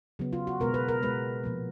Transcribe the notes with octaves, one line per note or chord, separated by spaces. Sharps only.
C#3 F#3 B3
F4
F#4
B2 G#3 B3 A#4
B4
A#4
B2 G#3 B3 B4
A#2 F3 G#3 B3